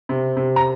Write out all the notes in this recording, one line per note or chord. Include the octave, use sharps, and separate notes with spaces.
C3
C3
A#5